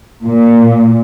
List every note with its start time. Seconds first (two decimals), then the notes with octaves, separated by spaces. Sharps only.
0.25 A#2